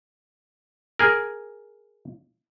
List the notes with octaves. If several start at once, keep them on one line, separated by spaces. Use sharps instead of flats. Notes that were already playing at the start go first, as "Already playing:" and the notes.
G#4 A#4